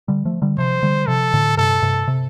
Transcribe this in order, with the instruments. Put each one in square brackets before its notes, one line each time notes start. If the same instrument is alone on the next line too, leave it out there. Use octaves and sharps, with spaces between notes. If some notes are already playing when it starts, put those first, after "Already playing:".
[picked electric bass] D3 G3
F3 A3
D3 G3
[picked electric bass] C3 F3 [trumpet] C5
[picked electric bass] D3 G3
[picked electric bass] C3 F3 [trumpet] A4
[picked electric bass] A2 D3
[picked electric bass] G2 C3 [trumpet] A4
[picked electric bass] G2 C3
C3